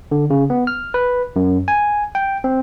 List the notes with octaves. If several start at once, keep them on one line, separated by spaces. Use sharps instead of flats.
D3
C#3
B3
F6
B4
F#2
G#5
G5
C4